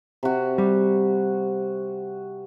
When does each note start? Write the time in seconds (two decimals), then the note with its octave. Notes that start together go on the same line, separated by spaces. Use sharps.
0.23 C3 F#4
0.58 G3